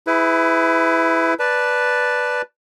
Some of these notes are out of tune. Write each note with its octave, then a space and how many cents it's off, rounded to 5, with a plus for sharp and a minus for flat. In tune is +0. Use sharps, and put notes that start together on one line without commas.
E4 +0 G#4 +0 B4 +30
B4 +0 D5 +0 A5 +0